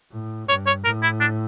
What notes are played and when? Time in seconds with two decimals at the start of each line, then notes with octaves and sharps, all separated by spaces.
0.12 A2
0.48 G2 C#5
0.66 C#5
0.84 A2 A#4
1.03 E4
1.20 D4